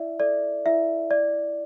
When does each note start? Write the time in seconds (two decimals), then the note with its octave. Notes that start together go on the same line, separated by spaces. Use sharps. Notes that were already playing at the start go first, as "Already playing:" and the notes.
Already playing: E4 D5 E5
0.20 A4 D5
0.66 E4 E5
1.11 D5